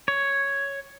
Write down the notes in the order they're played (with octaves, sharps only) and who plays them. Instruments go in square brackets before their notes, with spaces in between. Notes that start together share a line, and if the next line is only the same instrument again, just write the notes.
[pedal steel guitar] C#5